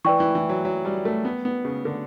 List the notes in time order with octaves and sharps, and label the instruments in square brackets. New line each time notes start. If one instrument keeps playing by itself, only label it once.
[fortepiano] E3 [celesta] B4 D5 G5 C#6
[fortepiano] E3
E3
F#3
F#3
G3
A3
B3
B3
C#3
D3